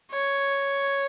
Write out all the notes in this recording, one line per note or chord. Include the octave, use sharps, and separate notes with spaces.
C#5